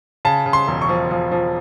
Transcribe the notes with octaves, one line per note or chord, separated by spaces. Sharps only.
C#3 A5
C#3
C6
E1
C#6
F3
F3
F3